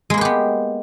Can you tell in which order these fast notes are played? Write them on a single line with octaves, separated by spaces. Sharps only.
G#3 A#3 B4 G4 B3